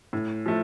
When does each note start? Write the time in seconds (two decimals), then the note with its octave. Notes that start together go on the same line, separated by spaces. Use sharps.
0.13 A2
0.46 F3 A3